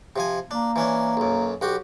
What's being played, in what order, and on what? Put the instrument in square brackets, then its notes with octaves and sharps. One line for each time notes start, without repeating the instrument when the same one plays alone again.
[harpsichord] C3 F3 G#5
[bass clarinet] A#3 [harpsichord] D4
[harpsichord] E3 C#4 D4
B1 F#2
B1 F#4 G4